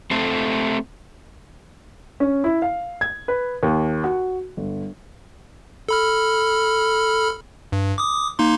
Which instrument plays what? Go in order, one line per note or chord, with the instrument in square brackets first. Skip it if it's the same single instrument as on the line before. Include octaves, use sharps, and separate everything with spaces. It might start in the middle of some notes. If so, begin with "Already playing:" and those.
[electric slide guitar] A3 C4 A4
[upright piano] C#4
E4
F5
G#6
B4
D#2
F#4
G1
[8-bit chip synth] A4 B5 F6
G2
D6 D#6
A#3 D#4 C6